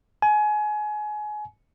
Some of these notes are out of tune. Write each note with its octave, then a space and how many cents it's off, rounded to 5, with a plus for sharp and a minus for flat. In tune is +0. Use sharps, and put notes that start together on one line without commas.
G#5 +25